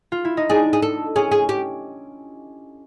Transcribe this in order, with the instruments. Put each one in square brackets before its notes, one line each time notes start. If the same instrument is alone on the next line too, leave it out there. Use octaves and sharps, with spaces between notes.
[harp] F4
E4
D#4
[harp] D4 [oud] G#4
[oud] G#4
A4
[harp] C#4 [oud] G#4
[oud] G#4
G4